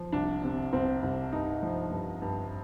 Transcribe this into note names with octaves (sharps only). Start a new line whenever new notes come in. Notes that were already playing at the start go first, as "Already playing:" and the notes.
Already playing: F3
C2 D4
C3
C2 C4
C2
G2 D#4
F3
G2
G2